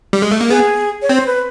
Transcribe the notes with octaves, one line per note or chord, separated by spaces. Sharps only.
G3
G#3
A3
A#3
B3 G#4
C#5
C4
C5
B4